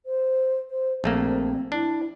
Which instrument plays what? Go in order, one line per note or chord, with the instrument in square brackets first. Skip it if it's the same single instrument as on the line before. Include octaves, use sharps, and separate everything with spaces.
[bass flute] C5
C5
[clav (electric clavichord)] A#1 A3 A#3 [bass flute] C4
[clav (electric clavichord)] D4 [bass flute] E4